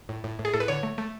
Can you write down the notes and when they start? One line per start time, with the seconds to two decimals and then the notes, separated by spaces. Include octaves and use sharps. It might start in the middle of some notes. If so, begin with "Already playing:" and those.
0.09 A2
0.24 A2
0.39 A2
0.45 G#4
0.54 A2 A4
0.60 B4
0.68 D3 C#5
0.83 A3
0.98 A3